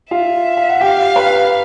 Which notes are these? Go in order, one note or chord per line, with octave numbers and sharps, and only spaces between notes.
F4 E5 F5
F5
F#5
G4 F5 G5
B4 B5